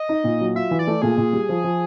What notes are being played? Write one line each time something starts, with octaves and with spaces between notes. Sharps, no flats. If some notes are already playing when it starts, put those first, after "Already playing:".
Already playing: D#5
D#4
A#2
F#3
F4 E5
E3
D5
A3
A#2 G#4
A#2
G3
F3
F3